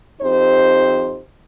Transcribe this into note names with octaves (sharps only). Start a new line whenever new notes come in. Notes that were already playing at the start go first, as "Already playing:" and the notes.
F2 C4 D#4 G4 C5